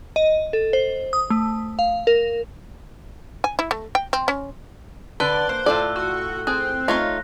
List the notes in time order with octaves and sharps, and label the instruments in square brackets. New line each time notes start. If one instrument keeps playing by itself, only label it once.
[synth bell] D#5
A4
C5
D#6
A3
F5
A#4
[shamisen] G#5
E4
A3
G5
C4
C#4
[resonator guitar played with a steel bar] D3 [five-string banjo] B4 [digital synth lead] D5 [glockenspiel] F#6 G7
[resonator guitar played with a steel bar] A#3 [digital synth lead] C5
[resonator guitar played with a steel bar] A2 F4 A4 [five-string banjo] D5 A5
[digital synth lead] F#4 [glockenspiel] F#6
[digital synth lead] C4 [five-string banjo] G#4 [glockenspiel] F#6
[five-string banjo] A3 C#5 F5 [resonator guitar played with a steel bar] D#4 F4 [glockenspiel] A#6